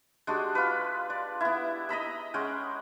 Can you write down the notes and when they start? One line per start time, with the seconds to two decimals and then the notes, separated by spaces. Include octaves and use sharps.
0.27 G#3 D4 F#4 G4
0.55 F4 B4
1.10 D5
1.40 B3 E4
1.89 D#5 A#5 B5 E6
2.34 G#3 C#4 F#5 G5